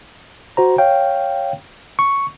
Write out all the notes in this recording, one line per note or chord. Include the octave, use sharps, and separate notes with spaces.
F#4 C5 A#5
C#5 F5 G5
C#6